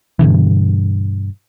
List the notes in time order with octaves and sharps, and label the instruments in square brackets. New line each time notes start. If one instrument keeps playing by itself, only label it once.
[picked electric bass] G2 B2 D3 E3